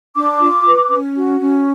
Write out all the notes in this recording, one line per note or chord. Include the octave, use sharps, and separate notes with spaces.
D4 D6
F4
B4
C#4
F#4
C#4